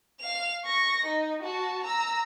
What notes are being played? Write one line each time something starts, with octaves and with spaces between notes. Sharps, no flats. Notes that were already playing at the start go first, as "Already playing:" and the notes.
F5 F7
C#6 A#6
D#4
F#4 A5
A#5 E6